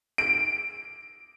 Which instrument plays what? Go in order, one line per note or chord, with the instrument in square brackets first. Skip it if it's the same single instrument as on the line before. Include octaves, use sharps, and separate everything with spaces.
[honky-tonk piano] D7